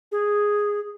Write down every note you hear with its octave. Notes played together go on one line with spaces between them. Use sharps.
G#4